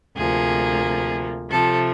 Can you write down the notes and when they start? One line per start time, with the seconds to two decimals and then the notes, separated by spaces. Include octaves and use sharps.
0.15 D2 C3 F3 A#3 G#4
1.51 C3 F3 A3 A4